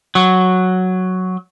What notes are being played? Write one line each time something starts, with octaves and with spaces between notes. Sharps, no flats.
F#3